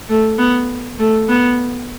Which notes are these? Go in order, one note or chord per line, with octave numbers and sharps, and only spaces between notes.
A3
B3
A3
B3